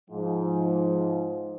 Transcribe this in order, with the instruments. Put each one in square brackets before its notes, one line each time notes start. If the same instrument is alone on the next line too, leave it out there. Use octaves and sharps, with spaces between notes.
[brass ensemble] G#2 F3